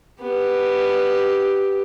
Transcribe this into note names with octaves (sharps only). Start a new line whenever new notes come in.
B3 G4